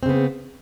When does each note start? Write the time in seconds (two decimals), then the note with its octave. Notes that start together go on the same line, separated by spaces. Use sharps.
0.03 C4
0.06 C#3
0.09 B3